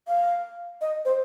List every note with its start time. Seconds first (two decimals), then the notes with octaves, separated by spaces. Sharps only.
0.08 F5
0.81 D#5
1.05 C5